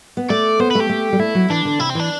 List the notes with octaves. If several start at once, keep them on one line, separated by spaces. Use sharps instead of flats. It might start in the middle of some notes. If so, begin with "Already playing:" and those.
B3
A3 D5
B3 C5
A3 B4
G4
A3
G3
A3 E4
F#3
E3 D4
D3
C3 E4
C4
E3 D4